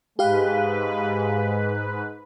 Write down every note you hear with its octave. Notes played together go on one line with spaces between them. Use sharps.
G#2 G#3 G4 B4 F5